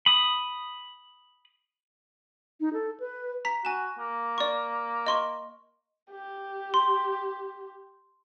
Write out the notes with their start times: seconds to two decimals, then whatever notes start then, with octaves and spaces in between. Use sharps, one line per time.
0.06 B5 D#6
2.60 D#4
2.73 A4
3.00 B4
3.45 A#5 B6
3.65 F#4 G#5 E7
3.99 A#3
4.38 D5 C#6
5.07 D#5 C6 C#6
6.11 G4
6.74 C6